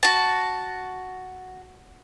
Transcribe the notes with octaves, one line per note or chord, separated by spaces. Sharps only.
F#4 A5